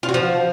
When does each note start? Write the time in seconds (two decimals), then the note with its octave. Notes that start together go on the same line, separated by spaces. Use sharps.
0.03 F4
0.09 F#4
0.14 F3